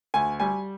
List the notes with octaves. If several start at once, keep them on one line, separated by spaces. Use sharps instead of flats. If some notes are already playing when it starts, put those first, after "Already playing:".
D2 G#5
G3 G#5